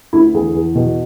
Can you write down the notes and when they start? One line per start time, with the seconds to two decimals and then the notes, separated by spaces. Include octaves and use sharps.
0.13 D2 E4
0.34 E2 G#4
0.55 E2
0.75 B2